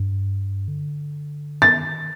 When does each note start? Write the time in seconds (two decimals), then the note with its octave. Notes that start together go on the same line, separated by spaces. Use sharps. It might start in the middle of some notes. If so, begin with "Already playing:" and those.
Already playing: G2
0.68 D3
1.62 D#3 A6